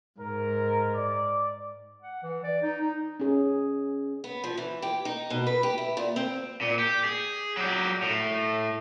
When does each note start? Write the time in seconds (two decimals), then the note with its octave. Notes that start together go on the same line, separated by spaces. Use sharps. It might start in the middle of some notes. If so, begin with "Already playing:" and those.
0.20 G#2 A#4
0.94 D5
2.02 F#5
2.23 E3
2.43 D5
2.62 D#4
2.81 D#4
3.20 C#4 G#4
4.24 B3
4.44 F3
4.57 E3
4.82 G4
5.05 D#4
5.30 B2
5.47 B4
5.63 G4
5.78 E4
5.97 A#2
6.16 C4
6.61 A#2
6.79 G4
7.04 G#4
7.57 F#3 G4
8.02 A2